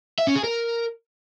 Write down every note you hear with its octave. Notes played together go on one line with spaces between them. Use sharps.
E5
C#4
G#4
A#4